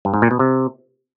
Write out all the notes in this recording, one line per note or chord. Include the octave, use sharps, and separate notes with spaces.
G2
G#2
A#2
B2
C3